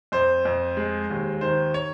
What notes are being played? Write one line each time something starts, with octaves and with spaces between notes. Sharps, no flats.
F2 C5
F2
G#3
D#2
D#3 C5
C#5